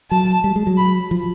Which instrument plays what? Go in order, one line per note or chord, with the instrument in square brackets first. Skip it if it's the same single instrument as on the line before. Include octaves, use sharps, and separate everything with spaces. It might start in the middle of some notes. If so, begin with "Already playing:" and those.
[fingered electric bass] F#3 [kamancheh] A5
[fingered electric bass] G3
G#3
F#3
[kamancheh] B5
[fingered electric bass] F3